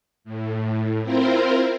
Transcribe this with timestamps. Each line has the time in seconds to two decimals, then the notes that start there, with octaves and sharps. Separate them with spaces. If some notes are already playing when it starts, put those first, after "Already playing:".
0.24 A2
1.02 C4 E4 F4 A#4 C5